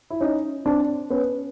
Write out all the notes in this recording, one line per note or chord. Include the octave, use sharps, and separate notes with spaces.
E4
C#4 D#4
C4 D4
B3 C#4